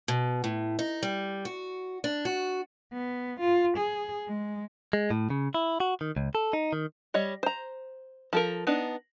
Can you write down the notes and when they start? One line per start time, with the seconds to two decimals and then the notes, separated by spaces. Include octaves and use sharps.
0.08 B2
0.44 A2
0.79 D#4
1.03 G3
1.45 F#4
2.04 D4
2.25 F#4
2.93 B3
3.41 F4
3.77 G#4
4.29 G#3
4.93 G#3
5.10 A2
5.30 C#3
5.54 E4
5.80 F#4
6.01 D#3
6.16 C#2
6.35 A4
6.53 D#4
6.73 D#3
7.14 G3 C#5 D#5
7.43 C5 A#5
8.33 F3 A4 A#4
8.67 B3 D4 D#4